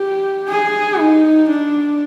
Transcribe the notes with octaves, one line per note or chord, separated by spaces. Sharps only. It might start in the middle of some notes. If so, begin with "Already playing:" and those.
Already playing: G4
G#4
D#4
D4